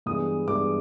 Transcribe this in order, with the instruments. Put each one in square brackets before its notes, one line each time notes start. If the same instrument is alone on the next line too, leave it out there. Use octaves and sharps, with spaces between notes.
[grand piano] G2 E3 G#3 B3 D#6
G2 E3 G#3 B3 D6